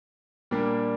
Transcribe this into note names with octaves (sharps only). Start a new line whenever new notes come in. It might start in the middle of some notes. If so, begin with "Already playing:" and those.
A#2 G3 A#3 D4